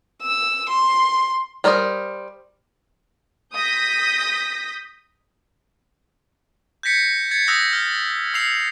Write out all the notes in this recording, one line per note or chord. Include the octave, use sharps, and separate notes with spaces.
E6
C6
G3 A#4 C5 D5 D#5
D#6 G6 A#6 B6
G6 G#6 A#6 B6 C#7
G#6 A6 C#7
D#6 E6 F#6 G6 A#6 B6
F6
E6 C7 F7